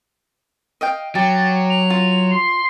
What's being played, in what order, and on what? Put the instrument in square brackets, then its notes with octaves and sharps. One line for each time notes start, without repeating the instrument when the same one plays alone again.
[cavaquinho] D#5 F5 G5
[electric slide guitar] F#3 [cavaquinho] G4 [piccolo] A6
[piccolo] F7
[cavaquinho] F4
[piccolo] C6